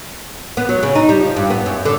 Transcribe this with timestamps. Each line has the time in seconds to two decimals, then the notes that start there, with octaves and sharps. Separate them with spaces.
0.57 B3
0.69 F#3
0.83 C#3
0.95 D#4
1.09 G3
1.20 F3
1.36 G2
1.50 B3
1.66 F#2
1.85 D3